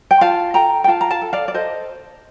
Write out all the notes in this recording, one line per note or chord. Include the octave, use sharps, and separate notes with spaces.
G5
F4 F5 A5
A4 G5 A#5
G5
F4 F5 A5
A#5
F5 A5
A4
D5 F5
D5
A4 C5 D#5